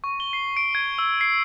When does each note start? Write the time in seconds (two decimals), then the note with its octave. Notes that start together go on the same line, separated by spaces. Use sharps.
0.04 C#6
0.20 G7
0.33 C7
0.57 D7
0.75 G#6
0.98 E6
1.21 C7